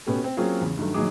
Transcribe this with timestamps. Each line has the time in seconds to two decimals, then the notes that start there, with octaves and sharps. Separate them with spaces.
0.07 B2 B3 C#4 G4 A4
0.24 C4
0.37 F#3 A#3 C4 C#4 F4 G#4
0.61 E2 C#3
0.77 G2 D#3 F#3 A3
0.94 A#1 D#3 F#3 G#3 G#4 D6